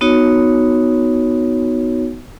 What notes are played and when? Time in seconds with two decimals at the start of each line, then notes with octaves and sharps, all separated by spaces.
0.01 B3 D#4 F#4 C#5